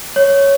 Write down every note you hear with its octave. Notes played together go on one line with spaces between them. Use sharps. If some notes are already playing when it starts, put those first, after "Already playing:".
C#5